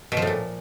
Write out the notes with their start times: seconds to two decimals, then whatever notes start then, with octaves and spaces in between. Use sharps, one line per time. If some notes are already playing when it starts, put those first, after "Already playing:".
0.12 B2
0.17 F3
0.22 A2
0.27 A#2